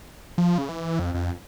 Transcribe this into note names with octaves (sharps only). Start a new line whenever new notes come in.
F3
C#3
E3
F2
F2